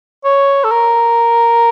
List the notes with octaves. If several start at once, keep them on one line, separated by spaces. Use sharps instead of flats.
C#5
A4
A#4